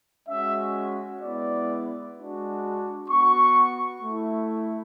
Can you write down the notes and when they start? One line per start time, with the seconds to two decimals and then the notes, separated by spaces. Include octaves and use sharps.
0.28 G#3 C#4 F#4 E5
1.21 G#3 B3 E4 D5
2.15 G#3 D4 F#4
3.09 B3 F#4 C#6
4.02 A3 E4